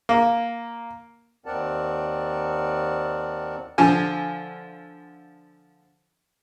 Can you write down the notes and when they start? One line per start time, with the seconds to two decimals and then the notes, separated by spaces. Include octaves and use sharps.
0.09 A#3
1.46 D#2 C4 A#4 D5 F#5 A5
3.78 D3 F3 G#5